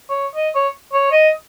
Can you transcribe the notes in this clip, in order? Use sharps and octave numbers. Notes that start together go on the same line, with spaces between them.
C#5
D#5
C#5
C#5
D#5